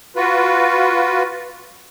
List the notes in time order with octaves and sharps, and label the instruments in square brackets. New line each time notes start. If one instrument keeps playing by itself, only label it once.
[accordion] F4 F#4 B4